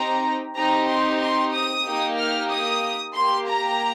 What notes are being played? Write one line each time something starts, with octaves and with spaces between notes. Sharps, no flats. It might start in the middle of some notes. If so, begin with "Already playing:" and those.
Already playing: C4 D#4 G4 A#5
C4 D#4 G4 A#5
C6
C6
D#6
A#3 D#4 G4
F6
D#6
A#3 G4 C6
A#5